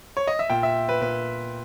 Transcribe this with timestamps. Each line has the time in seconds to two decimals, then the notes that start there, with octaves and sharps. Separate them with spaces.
0.17 C#5
0.27 D#5
0.39 E5
0.50 A#2 G5
0.63 E5
0.89 B4
1.01 A#2 B4